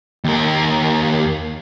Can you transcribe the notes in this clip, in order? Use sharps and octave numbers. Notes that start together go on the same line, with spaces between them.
D#2 A#4